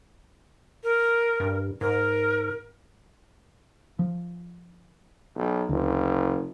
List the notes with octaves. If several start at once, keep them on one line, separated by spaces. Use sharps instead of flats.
A#4
G2
G#2 A#4
F3
B1
F#1 D2